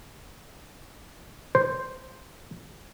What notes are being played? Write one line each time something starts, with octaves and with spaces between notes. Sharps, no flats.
C5